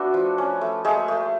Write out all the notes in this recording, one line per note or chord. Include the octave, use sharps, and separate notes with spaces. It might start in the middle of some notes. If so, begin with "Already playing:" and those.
Already playing: A3 B3 D4 F#4 A4
F3
C#4
A3
G#3 A3 G#4
A3